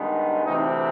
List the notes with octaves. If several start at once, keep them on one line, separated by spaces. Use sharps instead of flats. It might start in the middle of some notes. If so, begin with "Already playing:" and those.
Already playing: G2 D#3 G#3 B3
D2 C3 E3 A3 C4 D#4